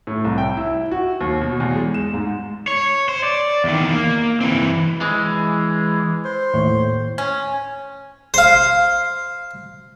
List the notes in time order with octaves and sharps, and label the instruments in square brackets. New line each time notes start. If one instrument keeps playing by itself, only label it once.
[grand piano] A2
C2
G5
E4
F#4
D#2
B2
E2
G#3
E7
G#2
[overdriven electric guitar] C#5
C5
D5
E2 D#3
A#3
E3 C4
[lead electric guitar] E3 G#3
[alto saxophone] C5
[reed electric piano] D#2 A2 C#5
[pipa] C#4
[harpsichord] C5 F5